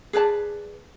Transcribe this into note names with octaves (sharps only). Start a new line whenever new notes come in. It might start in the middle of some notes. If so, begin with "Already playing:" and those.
G#4 B4 D5 A5